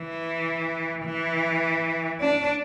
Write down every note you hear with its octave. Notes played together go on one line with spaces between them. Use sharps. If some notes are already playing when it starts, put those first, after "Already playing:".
Already playing: E3
E3
D4